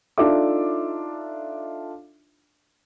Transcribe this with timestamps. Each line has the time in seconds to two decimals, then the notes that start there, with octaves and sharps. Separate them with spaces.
0.18 D4 D#4 F4 A4 E5 D6